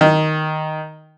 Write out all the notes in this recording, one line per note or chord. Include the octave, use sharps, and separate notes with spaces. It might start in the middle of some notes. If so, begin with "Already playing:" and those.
D#3